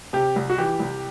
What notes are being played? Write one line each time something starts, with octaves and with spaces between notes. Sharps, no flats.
C3 G4
C2
F#4
E3 G4
C2